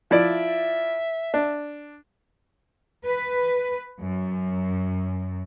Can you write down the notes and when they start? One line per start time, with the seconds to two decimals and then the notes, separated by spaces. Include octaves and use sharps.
0.11 F3 E4 D5 E5
1.34 D4
3.05 B4
4.01 F#2